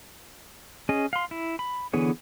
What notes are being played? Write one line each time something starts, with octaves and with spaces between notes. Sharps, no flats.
C#4 G#4 D#5
F5 C6
E4
B5
D3 E3 B3 G#4 C#5